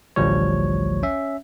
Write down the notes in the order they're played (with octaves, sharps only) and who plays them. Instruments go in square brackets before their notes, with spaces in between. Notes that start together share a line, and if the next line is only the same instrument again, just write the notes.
[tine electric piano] A1 D2 F3 G3 C#5
C#4 E5